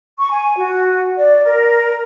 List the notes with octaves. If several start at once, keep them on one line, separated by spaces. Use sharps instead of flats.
C#6
G#5
F#4
D5
A#4